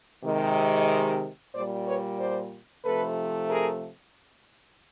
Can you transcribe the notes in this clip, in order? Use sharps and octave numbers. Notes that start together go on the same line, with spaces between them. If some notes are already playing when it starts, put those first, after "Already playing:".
C3 D#3 G#3
A#2 G3 C5 D5
B4 C#5
C5 D5
C3 F3 A3 A4 B4
G#4 A#4